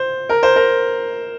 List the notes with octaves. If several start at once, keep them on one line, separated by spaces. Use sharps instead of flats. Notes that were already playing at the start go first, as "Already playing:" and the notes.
Already playing: C5
A#4
C5
A#4